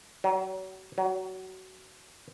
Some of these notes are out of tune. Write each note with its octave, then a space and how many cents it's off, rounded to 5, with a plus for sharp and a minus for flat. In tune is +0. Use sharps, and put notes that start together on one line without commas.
F#3 +35
F#3 +20